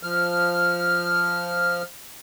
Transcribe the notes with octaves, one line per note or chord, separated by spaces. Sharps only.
F3 F6